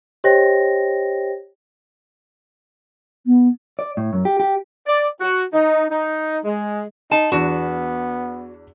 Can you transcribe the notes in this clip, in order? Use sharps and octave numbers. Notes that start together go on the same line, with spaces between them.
G4 C5 C#5 D#5 G5 A#6
B3
D5
A2
F#2
G4
G4
D5
F#4
D#4
D#4
G#3
D#4 A5
E2 B3 D4 F#4